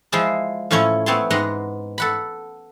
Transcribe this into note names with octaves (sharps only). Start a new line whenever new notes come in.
F3 G#3 E4 F4 G#4 C5
A2 F3 C#4 E4 C#5
A3 B3 C4 C#5 A5 C6
G#2 G#3 B3 F#5 A#5 C6
A4 F#5 B5